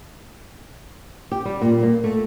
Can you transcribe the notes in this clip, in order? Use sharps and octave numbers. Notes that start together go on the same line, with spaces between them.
G4
G3
A#2
A#3
A3